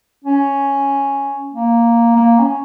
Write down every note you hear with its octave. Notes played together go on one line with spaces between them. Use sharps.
C#4
A#3
A#3
C#4